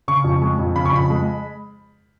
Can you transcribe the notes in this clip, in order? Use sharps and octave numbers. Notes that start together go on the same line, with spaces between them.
C#3 C#6
F2
G#3
F2
C#3 B5
C#6
F2 B5
G#3